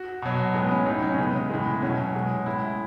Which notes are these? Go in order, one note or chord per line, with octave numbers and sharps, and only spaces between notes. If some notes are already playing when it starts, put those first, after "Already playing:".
Already playing: F#4
B2 F#3
A2 G#3 B3
C#4
A2 F#3 D#4
C#4
C#4
C#3 G#3 B3
A2 E3 G#3
B2 F#3 C#4
B2 G#3
A2 G#3 E4